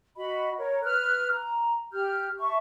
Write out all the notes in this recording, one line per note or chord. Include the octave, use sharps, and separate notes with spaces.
F#4 D#5 B5
A#4 C#5
B4 F6 F#6
A#5
G4 F6 G6
E5 A5 C#6